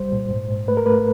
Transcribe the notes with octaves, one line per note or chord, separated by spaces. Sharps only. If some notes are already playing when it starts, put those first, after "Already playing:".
Already playing: C2 G3 C5
A#2
G#2
G#2
A3 B4
A#4
A3 B4